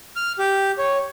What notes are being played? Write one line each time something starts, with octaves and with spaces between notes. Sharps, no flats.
F6
G4
C#5